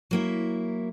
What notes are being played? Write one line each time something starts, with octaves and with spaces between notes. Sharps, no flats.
F#3 A#3 E4